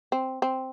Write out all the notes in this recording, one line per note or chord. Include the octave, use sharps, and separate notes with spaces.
C4
C4